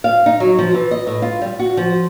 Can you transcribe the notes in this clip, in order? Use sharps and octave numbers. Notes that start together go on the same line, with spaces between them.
F5
D#4
F#3
F3
E3
D#5
A2
F4
G3
F#4
F3